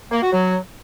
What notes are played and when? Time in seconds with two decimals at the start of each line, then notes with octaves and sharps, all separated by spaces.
0.12 A#3
0.22 F#4
0.32 F#3